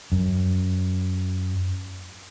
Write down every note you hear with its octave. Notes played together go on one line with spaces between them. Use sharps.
F#2